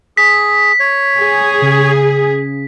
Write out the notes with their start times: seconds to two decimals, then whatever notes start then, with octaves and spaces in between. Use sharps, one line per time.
0.17 G#4 B6
0.80 C#5
1.18 G#4
1.62 C#3